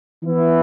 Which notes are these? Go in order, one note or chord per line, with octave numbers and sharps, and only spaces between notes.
E3 B3 E4